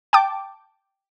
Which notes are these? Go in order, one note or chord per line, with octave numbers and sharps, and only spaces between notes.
G5 A5 D6